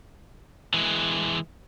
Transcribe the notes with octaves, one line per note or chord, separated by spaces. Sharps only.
E3 G#3